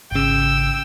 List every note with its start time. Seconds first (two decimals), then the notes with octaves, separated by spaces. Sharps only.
0.11 G#1 C#3 G5 E6